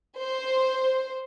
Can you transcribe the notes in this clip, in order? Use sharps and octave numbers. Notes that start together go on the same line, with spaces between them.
C5